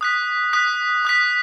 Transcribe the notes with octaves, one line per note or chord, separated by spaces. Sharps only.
D#6 F#6 B6
D#6 F#6 B6
D#6 F#6 B6